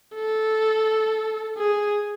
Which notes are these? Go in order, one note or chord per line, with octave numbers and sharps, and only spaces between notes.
A4
G#4